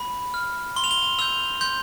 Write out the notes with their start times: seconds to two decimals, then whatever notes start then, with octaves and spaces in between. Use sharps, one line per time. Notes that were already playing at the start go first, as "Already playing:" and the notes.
Already playing: B5
0.34 F6
0.76 C6 G7
0.84 F7
0.91 G7
1.19 E6 G6 F7
1.61 C6 G6